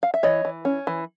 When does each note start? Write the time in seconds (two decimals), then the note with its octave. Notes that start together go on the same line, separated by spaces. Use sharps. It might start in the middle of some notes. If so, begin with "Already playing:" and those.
0.03 F5
0.14 E5
0.23 E3 C#5 D#5
0.45 E3
0.65 C#4
0.87 E3